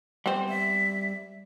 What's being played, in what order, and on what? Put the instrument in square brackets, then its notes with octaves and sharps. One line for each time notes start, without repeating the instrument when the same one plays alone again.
[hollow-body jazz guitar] G3 C5 [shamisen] B3 C4
[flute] E5